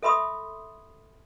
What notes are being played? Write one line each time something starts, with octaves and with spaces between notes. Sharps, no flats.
A4 E5 B5 C6 D#6